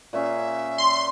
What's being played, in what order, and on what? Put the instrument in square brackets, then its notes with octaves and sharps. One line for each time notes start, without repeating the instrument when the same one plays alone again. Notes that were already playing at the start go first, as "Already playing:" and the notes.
[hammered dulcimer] A#2 C#4 G#4 [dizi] E5
[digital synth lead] C6